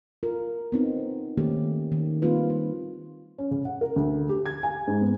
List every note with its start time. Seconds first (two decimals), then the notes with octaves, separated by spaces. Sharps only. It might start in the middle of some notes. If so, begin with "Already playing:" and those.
0.23 F4 A#4
0.72 B3 C4 D#4
1.37 D#3 A3 A#3 C#4 G4
1.92 D#3
2.22 G3 A#3 C4 D#4 F4 B4
2.50 F4
3.38 C#4
3.51 C#3
3.65 F#5
3.81 A#4
3.96 D2
4.29 G4
4.46 G#6
4.63 G#5
4.87 G#2
5.01 B3